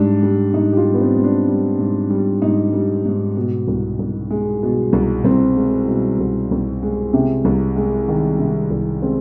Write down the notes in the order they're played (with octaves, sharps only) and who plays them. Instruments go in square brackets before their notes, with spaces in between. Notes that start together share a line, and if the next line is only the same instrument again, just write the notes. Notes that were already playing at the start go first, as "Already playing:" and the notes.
Already playing: [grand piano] G#2 G3 D4
G3
G#2 D#4
G4
F4
G3
B3
C4
G#2
D4
G3
G#2
G3
G#2 D#4
G3
G#2
B2
C2
C2
G#3
B2
C2
C2 C4
G#3
B2
C2
C2
G#3
C3
C2
G#3
D#3
C3
C2
G#3 C4